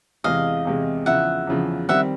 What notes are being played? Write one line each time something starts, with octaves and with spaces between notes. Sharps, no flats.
E2 C3 E3 G#3 D#5 F5
E2 C3 E3 G#3
E2 C#3 F3 E5 F#5
E2 C#3 F3
D#3 G3 C4 E5 F#5